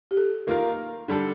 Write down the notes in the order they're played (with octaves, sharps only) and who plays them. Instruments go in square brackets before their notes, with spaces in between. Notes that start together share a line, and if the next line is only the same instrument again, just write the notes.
[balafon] G4
A4
[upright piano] D#3 A#3 F4 A#4
D3 G3 D4 A4